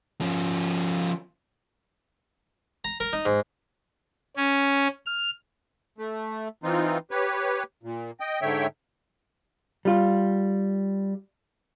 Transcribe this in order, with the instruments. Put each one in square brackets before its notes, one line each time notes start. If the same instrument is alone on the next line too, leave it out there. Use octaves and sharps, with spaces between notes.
[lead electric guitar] F3 C#4
[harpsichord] A#5
A#4
D#4
G#2
[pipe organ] C#4
F6
[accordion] A3
E3 C4 D#4 F4
G4 B4 C#5
A#2
D#5 G5
G#2 D3 C#5 E5 G5
[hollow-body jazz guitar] G3 F4